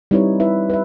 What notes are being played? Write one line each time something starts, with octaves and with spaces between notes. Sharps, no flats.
G3 C4 D#4 E4 B4 C#5
E4 B4 E5
B4 E5